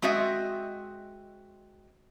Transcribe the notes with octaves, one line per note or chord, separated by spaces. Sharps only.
G#3 C4 F#4 D#5 E5